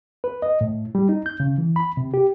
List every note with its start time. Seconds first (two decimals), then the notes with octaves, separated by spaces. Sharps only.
0.24 B4
0.42 D#5
0.61 A2
0.95 G3
1.09 D#4
1.26 G6
1.40 C#3
1.58 E3
1.76 B5
1.97 C3
2.14 G4